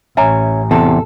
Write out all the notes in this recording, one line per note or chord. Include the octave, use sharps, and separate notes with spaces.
A1 C#4 E5 G#5 A#5
E2 C3 A4